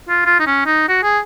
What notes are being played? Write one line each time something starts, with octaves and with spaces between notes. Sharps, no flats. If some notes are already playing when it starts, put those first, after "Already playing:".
F4
F4
D#4
C#4
D#4
F#4
G#4